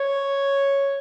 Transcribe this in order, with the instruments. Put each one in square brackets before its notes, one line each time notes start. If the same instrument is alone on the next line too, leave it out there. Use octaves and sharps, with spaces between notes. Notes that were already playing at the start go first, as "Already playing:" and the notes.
Already playing: [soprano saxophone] C#5